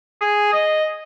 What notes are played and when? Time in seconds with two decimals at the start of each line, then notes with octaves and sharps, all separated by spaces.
0.21 G#4
0.53 D#5